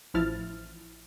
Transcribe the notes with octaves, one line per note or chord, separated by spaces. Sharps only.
A1 F3 E4 F6 A6